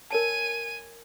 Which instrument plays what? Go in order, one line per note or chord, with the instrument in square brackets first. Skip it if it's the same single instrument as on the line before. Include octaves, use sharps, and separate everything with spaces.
[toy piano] A#4 C#5 A5 [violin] G#5 D#7